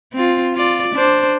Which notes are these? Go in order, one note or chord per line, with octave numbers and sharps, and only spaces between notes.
C4 F4
F4 D5
D4 C5